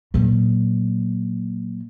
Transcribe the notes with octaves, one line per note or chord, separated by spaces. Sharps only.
A#2 F#3